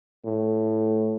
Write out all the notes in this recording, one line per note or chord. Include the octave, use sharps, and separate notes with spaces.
A2